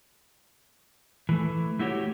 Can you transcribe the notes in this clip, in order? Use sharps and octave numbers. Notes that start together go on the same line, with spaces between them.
E3 A3
A3 E4 F#4 G4 C#5